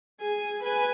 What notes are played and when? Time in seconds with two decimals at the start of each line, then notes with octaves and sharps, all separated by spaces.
0.20 G#4 G#5
0.63 B4 G#5